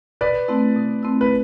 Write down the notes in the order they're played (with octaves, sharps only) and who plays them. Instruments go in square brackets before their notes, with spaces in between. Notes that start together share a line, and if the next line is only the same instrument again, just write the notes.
[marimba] B2 [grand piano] B4 D5
[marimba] A3 C4 E4
B2
A3 C4 E4
[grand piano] B4